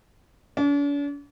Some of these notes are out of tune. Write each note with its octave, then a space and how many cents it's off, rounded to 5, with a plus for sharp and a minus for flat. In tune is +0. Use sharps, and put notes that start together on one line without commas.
D4 -45